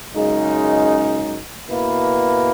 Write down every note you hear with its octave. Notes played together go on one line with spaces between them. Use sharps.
F#2 C#3 G#3 D#4
B2 A#3 E4 B4